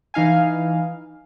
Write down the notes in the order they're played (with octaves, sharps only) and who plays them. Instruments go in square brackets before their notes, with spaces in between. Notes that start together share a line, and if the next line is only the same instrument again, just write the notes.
[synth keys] E3 D#4 F5 G#5